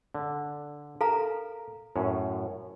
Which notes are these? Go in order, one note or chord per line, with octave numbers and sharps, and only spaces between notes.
D3
A4 A#4 F5 A#5
F#2 A2 C#4